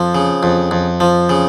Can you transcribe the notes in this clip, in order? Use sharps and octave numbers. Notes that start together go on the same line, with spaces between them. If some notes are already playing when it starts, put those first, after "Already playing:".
Already playing: F2 F3
C#3
F2
F2
F3
C#3